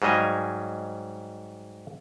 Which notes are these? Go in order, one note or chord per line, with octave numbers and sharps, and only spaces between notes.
G#2 F#3 G3 D#5 F5 G#5